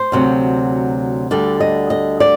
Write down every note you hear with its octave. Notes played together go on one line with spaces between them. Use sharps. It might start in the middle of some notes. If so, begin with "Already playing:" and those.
Already playing: C5
D2 C3 F#3
D2 D3 G3 D5
D#5
D#5
D5